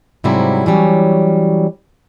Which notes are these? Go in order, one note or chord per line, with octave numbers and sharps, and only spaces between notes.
G#2 C3 F#3 G3 E4
E3 F#3 G3 C#4